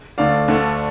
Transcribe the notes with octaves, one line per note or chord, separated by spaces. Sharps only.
D2 D3 A3 D5 F5
D2 D3 A3